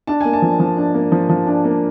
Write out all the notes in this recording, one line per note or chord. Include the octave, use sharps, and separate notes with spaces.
D4 A5
A#3 G#5
A5
F3
F3
D4
A#3
F3
F3
D4
A#3